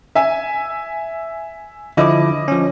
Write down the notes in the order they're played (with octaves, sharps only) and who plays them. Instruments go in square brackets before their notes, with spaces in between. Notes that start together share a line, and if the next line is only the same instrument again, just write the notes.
[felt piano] E5 G#5
[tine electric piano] D3 F3 E4 [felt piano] D#5 D6
[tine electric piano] F3 C#4